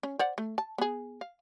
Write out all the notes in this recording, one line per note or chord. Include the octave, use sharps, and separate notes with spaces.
C#4
C5 D5 F#5
A3
A5
B3 G#4
F5